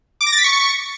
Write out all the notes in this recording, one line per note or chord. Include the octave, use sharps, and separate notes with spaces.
D6
A#6
A6
B6
C#6